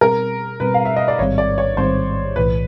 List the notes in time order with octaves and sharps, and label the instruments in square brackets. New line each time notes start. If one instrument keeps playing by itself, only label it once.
[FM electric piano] B2 G3 C4 [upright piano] A#4
[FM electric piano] B2 G3 C4 [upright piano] B4
[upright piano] F5
E5
D#5
D5
[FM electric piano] A1 G#2 D#3 G3 C4 [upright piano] C#5
[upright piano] D5
C#5
[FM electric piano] A1 G#2 D#3 G3 C4 [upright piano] C5
[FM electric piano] B1 A2 E3 [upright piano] B4